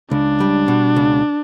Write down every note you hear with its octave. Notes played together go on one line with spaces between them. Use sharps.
C#2 D4
G3
B2
C#2